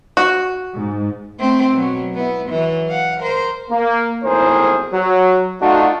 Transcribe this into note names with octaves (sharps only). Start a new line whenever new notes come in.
F#4
G#2
A3 C4
B2 F#3
B3 E4
E3 F#3
F5 F#5
A#4 C5
A#3
G#1 E2 A2 G#4 A#4 C5
F#3
A3 D4 D#4 F4 F#4